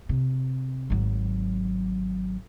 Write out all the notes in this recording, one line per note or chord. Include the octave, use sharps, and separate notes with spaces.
C3
G#1 F#3